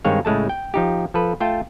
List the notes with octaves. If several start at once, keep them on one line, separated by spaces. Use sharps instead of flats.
G2 D#3 G#3 C4 C#5 F5
A2 C#3 G#3 A3 A5
G5
F3 D#4 G4
F3 A4 B4
A3 F4 G5 A5